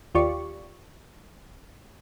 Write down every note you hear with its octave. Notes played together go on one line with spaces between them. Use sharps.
D#2 F4 G4 D5 C#6